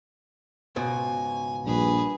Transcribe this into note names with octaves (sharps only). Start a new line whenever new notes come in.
C#2 G#2 B2 G#5
A#1 G2 G#4 B4